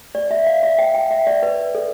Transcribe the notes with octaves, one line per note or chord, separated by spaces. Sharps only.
D5
E5
F5
E5
G5
G5
E5
D5
B4
A4